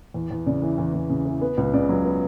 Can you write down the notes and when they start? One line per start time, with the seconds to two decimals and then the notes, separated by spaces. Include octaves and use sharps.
0.14 E2
0.31 E2
0.46 C#3 D5
0.62 E3
0.78 E2
0.94 E2
1.09 C#3
1.25 E3
1.41 B3
1.57 C#2
1.73 C#3 D5
1.89 F#3
2.05 B3